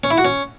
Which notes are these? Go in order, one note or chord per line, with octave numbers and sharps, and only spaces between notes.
C#4
E4
F#4
C#4